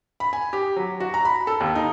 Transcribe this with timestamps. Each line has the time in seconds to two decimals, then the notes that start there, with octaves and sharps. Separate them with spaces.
0.20 B5
0.33 G#5
0.53 G4
0.76 F#3
1.00 F#4
1.14 A#5
1.25 B5
1.47 A4
1.61 D#2
1.75 D#4